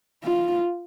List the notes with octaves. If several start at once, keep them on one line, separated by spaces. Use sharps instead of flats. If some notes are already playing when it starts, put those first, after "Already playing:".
F4